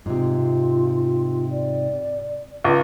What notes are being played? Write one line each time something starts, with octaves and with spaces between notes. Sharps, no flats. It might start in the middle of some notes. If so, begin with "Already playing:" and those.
G#2 C3 F4
D5
C#2